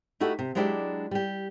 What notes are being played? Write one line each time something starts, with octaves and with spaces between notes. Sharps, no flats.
A3 D#4 E4 F#4 G4 A4
C3
F#3 G#3 D4 E4 G4 D5
G3 G4